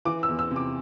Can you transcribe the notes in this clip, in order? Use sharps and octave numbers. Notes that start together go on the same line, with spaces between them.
E3 D6
E6
E2
E6
C3
D6